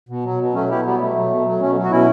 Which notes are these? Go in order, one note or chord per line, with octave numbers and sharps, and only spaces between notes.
B2
F#3
B2
F#3 A3 C#4
B2 E4 G4
F#3 G3 B3
B2 A3
F#3
B2
F#3
B2 A3 C#4
F#3
F#4
B2 C#4 E4